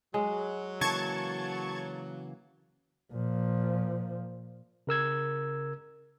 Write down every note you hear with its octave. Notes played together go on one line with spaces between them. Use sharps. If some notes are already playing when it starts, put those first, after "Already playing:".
F#3 G#3
C#3 E3 A#3 A5 C#6 G#6
A#2 F3
C#3 A#4 E6 G#6